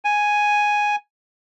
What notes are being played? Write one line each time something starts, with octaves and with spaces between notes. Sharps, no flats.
G#5